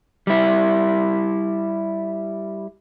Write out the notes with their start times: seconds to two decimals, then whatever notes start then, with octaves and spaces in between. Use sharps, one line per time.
0.27 G3 E4